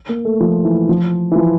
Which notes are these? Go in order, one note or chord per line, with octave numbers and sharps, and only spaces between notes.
A#3
A3
F3
E3
F3
E3
F3